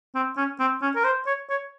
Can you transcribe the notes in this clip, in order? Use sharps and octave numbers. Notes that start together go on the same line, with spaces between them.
C4
C#4
C4
C#4
A#4
C5
C#5
C#5